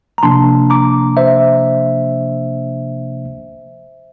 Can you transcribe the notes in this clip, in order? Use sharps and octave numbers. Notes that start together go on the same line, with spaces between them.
A#5
C3 F3 A#3 D4 A5 C6
A#5 D6
C5 E5